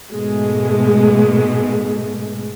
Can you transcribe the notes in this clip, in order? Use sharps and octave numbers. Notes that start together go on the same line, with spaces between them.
G#2 B2 G#3 A3